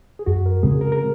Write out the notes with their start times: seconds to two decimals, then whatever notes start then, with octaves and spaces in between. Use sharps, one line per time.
0.19 G#4
0.26 F#2 F#4
0.46 A#4
0.63 C#3 G#3 C4 G#4
0.81 A#4
0.92 A#4